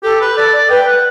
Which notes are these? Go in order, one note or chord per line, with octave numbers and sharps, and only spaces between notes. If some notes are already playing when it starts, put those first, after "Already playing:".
G4 A4
B4
A4 D5
D5
B4 G5
F#5